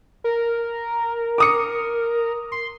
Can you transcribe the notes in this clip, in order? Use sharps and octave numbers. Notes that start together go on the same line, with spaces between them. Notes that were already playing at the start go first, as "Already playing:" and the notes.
A#4
D6 D#6 C#7
C6